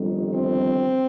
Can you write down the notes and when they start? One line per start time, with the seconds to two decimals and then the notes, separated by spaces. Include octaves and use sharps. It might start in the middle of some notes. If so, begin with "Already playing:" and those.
Already playing: G1 F2 D#3 G3
0.34 C4